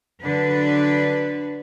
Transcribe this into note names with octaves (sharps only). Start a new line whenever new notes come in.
D3 F#3 D4 B4